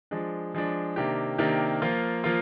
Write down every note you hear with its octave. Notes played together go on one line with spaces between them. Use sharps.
F3 G#3 D4
F3 G#3 D4
C3 D#3 A#3 D4 G4
C3 D#3 A#3 D4 G4
F3 A#3 F4
F3 A#3 F4